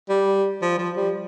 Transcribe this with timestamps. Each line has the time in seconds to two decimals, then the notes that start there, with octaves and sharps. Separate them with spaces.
0.09 G3
0.62 F3
0.78 F3
0.97 G3